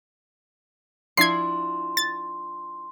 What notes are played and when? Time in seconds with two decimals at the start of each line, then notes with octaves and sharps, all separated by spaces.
1.17 F3 D4 E4 C6 G#6 C7
1.97 A6